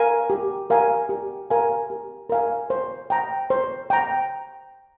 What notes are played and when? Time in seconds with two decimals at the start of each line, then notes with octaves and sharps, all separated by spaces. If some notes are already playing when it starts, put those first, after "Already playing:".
Already playing: A#4 F5 G#5
0.30 G4
0.70 A#4 F5 G#5
1.09 G4
1.50 A#4 F5 G#5
1.90 G4
2.30 A#4 F5 G#5
2.70 C5
3.10 G5 A#5
3.50 C5
3.90 G5 A#5